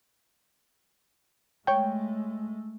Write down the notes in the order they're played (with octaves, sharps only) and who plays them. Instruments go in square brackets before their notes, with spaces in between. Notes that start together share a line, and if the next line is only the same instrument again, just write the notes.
[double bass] G#3 A3 [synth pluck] C#5 G5